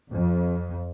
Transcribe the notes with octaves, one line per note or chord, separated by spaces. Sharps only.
F2